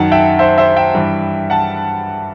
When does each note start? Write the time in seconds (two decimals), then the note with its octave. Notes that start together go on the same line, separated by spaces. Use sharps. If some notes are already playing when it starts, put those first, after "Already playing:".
Already playing: F#2 D#3 F#5 A5
0.12 E5 G5
0.39 C5 E5
0.58 C5 E5
0.76 E5 G5
0.94 G2 E3
1.50 F#5 A5